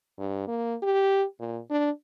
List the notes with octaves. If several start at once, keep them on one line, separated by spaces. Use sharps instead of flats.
G2
A#3
G4
A#2
D4